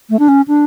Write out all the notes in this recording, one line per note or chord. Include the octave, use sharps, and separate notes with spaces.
A3
D4
C#4
D4